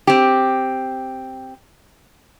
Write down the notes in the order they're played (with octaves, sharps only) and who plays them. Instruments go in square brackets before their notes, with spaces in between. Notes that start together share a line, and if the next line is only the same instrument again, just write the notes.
[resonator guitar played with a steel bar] C4 G4